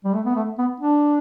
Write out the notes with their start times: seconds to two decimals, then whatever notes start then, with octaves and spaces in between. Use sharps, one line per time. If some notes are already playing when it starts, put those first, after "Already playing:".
0.04 G3
0.13 A3
0.25 B3
0.35 A3
0.58 B3
0.80 D4